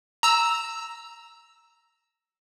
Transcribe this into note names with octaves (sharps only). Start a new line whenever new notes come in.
A#5 E6